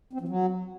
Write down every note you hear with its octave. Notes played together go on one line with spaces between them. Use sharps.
C4
F3
F#3